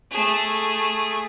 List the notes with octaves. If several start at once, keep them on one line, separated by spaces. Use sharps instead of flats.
A3 G#4